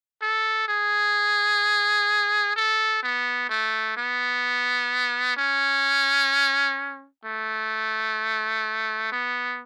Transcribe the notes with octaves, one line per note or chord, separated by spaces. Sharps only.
A4
G#4
A4
B3
A3
B3
C#4
A3
B3